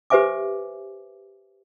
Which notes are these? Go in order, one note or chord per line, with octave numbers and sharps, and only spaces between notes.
G4 B4 C5 E5 G#5 D6